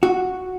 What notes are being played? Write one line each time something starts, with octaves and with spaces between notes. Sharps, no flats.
F#4